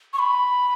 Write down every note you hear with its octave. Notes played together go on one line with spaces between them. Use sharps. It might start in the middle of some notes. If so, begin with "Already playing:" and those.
C#6
B5